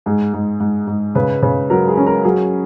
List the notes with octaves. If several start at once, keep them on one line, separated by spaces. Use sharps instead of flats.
G#2 G#4
G#2
G#2
G#2
C#3 B4
C#3
F#3 A#4
G#4
C#4
A#4
F#3 G#4